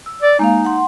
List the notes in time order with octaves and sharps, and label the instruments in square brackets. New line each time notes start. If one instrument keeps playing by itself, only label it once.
[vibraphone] E6
[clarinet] D5
[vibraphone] G#3 A#3 F5 [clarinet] D#4
[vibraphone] F#5 C6